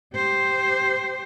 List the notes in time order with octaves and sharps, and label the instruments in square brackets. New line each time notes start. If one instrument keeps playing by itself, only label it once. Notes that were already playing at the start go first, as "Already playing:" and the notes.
[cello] G4 C5